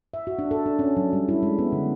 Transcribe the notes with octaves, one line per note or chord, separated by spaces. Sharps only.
E5
F#4
D4
A4
D4
C#4
F#3
G3
E4
G#3
B3
D3